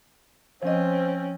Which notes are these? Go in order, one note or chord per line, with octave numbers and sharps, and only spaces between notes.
F3 C4 C#4 C5 D#5